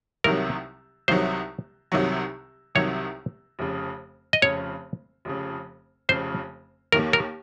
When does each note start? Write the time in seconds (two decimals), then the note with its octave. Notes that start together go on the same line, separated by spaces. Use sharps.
0.24 C2 C3 D#3 F#3 A#4
1.08 C2 C3 D#3 F#3 C5
1.92 C2 C3 D#3 F#3
2.75 C2 C3 D#3 F#3 C#5
3.59 F1 F2 C#3
4.33 D#5
4.42 F1 F2 C#3 C#5
5.25 F1 F2 C#3
6.09 F1 F2 C#3 C5
6.92 D#2 D#3 A#3 A#4
7.13 A#4